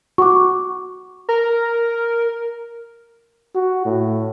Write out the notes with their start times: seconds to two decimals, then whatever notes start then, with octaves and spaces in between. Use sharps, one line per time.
0.18 F#4 C#6 D6
1.29 A#4
3.55 F#4
3.85 A2